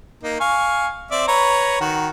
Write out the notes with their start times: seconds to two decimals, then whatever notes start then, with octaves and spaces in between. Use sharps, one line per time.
0.23 A#3 D#4
0.40 F5 G#5 C#6
1.11 C4 D5 E5
1.28 B4 C#5 A#5
1.81 D#3 F#4